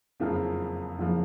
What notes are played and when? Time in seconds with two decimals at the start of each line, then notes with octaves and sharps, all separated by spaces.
0.20 F#1 F2 C#3 F3
0.98 F#1 F2 C#3 F3